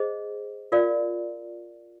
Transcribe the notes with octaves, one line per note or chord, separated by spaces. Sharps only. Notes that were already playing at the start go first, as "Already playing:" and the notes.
Already playing: G#4 C5 D#5
F4 A#4 D5 F5